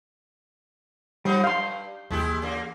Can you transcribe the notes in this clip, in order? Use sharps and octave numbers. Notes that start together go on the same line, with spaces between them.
F3 G3 B3 D#4
G2 F5 C6 G6
D#2 E3 G#3 E4 G4
C#3 A#3